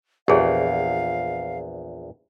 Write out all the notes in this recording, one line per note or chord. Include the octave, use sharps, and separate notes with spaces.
A#1 E2 G4 G#4 C#5 F5